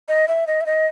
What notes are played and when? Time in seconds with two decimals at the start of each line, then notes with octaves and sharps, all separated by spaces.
0.08 D#5
0.28 E5
0.47 D#5
0.61 E5
0.66 D#5